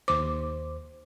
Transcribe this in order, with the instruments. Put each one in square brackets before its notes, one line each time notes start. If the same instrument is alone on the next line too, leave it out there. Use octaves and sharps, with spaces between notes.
[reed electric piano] D#2 C5 [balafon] D6